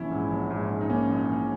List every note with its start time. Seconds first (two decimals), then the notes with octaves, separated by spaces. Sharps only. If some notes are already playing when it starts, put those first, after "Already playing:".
Already playing: A#1 E3 C#4 E4
0.11 G#2
0.30 A#1
0.50 G#2
0.70 G#2
0.81 D#4
0.90 A#1 A#3 C#4
1.10 A#1
1.31 A#1